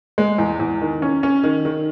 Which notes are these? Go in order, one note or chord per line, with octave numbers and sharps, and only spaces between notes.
G#3
E2
E2
D#3
C#4
C#4
D#3
D#3